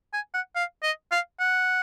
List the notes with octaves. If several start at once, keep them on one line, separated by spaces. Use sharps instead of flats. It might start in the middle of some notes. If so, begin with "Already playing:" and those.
G#5
F#5
F5
D#5
F5
F#5